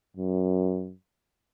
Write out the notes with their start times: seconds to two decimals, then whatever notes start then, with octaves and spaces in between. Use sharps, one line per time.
0.17 F#2